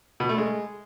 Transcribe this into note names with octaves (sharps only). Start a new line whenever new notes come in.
B2
A3
G#3